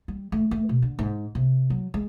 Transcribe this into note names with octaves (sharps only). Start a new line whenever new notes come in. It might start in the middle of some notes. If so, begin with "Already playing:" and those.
G3
A3
A3
B2
D3
G#2
C3
F#3
G#3